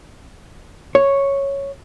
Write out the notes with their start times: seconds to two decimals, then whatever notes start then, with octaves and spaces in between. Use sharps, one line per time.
0.95 C#5